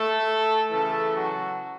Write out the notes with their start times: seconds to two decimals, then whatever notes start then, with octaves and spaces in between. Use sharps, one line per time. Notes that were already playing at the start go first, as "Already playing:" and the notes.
Already playing: A3 A4
0.71 C#3 E3 A3 A4
1.14 F#3 F#4